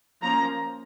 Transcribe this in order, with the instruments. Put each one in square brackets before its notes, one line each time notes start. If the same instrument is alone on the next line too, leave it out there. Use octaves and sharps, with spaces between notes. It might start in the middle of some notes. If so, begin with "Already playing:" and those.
[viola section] F3 A#3 C#4 A#5